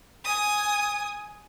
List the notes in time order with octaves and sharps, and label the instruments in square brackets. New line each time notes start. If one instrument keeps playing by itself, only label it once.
[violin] G#5 D#6